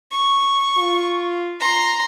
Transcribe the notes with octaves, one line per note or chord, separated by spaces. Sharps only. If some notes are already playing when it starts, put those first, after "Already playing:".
C#6
F4
A#5 C6